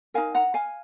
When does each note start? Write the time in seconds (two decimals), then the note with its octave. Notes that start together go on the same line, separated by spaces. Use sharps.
0.14 D#4 A#4 F5 G#5
0.35 F#5 A#5
0.54 F5 G#5